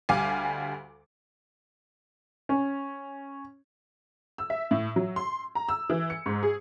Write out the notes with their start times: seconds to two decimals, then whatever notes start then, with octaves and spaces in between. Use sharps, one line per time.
0.09 D2 G3 F5 G#5 D6
2.49 C#4
4.38 E6
4.50 E5
4.71 A2
4.96 F#3
5.16 C6
5.55 A#5
5.69 E6
5.90 E3
6.10 C#7
6.26 G#2
6.43 G#4